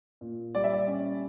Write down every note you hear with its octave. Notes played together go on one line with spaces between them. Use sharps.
A#2
G3 D5
E5
D5
C#4